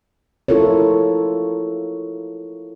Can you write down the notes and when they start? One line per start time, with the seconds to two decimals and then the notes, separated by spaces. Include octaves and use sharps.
0.48 E4 F4 A4 A#4 C#5